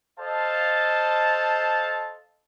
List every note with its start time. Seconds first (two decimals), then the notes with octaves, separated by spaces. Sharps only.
0.18 A4 C5 D#5 F5 A5